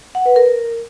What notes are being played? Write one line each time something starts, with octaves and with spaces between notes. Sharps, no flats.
F#5
B4
A#4